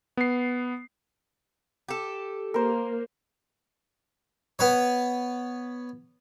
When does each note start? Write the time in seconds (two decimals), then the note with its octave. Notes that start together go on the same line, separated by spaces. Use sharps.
0.17 B3 C7
1.89 G4 A4
2.54 A#3 A#4 C5
4.59 B3 B4 C#5